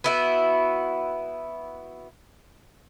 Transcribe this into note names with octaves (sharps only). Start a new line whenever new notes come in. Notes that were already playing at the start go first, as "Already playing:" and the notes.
B3 E4 F#4